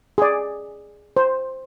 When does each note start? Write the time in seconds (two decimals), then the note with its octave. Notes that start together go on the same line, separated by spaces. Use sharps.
0.18 G#4 D5
1.17 C5